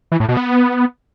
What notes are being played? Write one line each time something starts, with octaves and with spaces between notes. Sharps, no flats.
E3
A2
B2
B3